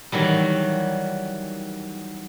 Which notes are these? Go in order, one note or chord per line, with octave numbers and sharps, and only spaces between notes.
D#3 E3 F#3 G3